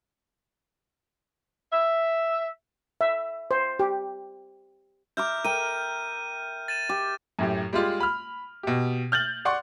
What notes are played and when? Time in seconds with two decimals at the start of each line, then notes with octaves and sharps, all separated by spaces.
1.73 E5
3.01 E5
3.51 C5
3.79 G4
5.17 E5 A#5 D6 F6 G6
5.44 A#4 G5 D#7
6.68 A6 D#7 E7
6.89 G4
7.39 F#2 A2 G4
7.73 G3 G#3 F4 G4
8.00 B5 F6
8.63 B2 G4
9.12 F6 G6 A6 F#7
9.45 D5 F#5 C6 C#6